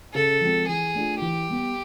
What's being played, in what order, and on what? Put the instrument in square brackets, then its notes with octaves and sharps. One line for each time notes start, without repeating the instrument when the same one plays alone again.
[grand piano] C#3 [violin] A4
[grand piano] F3 G#3 C4
[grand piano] E3 [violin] G#4
[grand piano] A3 D4 F4
[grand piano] E3 [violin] G4
[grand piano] G3 B3